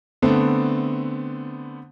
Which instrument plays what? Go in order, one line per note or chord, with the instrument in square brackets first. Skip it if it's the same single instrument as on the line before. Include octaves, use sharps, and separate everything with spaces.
[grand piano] D3 A3 B3 C4